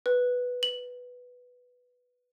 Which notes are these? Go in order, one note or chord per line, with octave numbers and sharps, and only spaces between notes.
B4
F#7